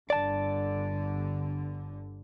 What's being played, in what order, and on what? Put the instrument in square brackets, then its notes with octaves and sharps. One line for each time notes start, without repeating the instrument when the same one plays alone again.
[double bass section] G1 D3 [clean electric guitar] D5 A5